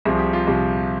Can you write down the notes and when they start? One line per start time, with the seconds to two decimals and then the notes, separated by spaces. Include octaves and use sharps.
0.05 C2 C3 F3 G#4
0.19 G4
0.33 F4
0.47 C2 C3 F3